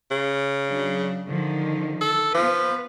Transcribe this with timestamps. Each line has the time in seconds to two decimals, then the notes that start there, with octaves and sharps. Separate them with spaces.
0.11 C#3
0.69 F#3 D4
1.27 D3 D#3 F3
2.01 A4
2.34 F3 B3 B4